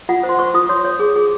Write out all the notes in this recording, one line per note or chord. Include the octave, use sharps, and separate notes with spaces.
F4 F#5
C5
C6
C5 C#6
F4 D#6
C#5 C6
C#5
G#4
G#4